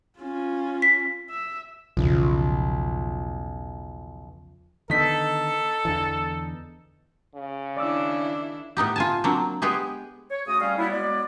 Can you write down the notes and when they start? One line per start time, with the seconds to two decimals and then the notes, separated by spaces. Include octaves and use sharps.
0.19 C#4 F4
0.82 B6
1.30 E5
1.97 B1 E2 C#3 F3
4.90 D3 D#3 B3 D#4 A4 B6
5.85 E2 D3 E3
7.35 C#3
7.77 D#3 D4 E4 D5 D6 E6
8.77 A2 B3 D#4 G4
8.96 F4 G#5 A5
9.24 F#3 A#3 C4 D4
9.62 G#3 B3 G4 G#4
10.31 C#5
10.47 C#3 A3 F#4 D#6
10.61 G3 C#4 F5
10.78 F#3 G3 A#3 B3 E4
10.91 F#3 G#3 B3 D5